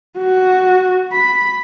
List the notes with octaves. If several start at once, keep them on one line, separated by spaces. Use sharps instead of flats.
F#4
B5